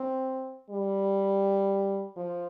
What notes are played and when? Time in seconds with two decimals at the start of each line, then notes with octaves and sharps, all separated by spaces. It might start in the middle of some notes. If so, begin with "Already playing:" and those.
Already playing: C4
0.71 G3
2.17 F3